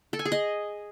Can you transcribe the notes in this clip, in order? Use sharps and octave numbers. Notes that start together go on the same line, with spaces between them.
A4
G#5
G#4
D#5